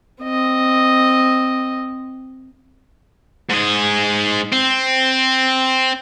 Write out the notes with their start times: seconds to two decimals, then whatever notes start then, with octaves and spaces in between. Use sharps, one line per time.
0.23 C4 D#5
3.50 G#2 G#4
4.52 C4